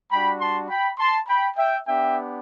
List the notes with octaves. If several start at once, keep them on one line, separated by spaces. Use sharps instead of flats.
G3 D4 F#4 G5 B5
A5 C6
G5 B5
A5 C6
G5 B5
E5 G5
B3 D4 G4 E5 G5